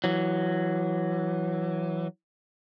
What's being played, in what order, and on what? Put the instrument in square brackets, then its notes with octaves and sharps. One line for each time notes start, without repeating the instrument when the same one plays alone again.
[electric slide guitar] E3 F#3